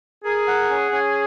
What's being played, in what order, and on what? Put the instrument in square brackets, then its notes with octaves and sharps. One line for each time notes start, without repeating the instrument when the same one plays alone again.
[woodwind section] G#4 [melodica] A#4
[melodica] F#5
C#4
C#4